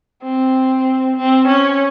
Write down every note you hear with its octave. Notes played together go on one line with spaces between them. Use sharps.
C4
C4
C#4